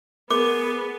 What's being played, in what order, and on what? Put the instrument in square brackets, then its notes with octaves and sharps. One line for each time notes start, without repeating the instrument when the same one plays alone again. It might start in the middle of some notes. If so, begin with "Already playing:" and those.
[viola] B3 [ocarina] G#4 [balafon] A#4 [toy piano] D6